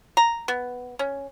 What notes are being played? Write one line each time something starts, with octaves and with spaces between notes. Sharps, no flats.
A#5
B3
C#4